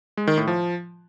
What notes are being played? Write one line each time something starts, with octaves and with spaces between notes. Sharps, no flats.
G#3
D#3
A2
F3